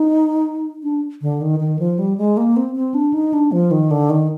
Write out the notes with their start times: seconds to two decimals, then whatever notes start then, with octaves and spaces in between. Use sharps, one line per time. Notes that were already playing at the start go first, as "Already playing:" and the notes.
Already playing: D#4
0.83 D4
1.22 D3
1.41 D#3
1.60 D#3
1.79 F3
1.99 G3
2.18 G#3
2.37 A#3
2.56 C4
2.75 C4
2.94 D4
3.14 D#4
3.33 D4
3.52 F3
3.71 D#3
3.91 D3
4.10 D#3